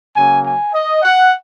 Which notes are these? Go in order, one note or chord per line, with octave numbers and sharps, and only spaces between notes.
C#3 F#3 A#3 G#5
G#5
D#5
F#5